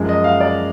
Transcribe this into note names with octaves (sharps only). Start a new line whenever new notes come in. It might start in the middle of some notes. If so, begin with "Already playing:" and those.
Already playing: F#2 F3 G#3
D#5
F5
D5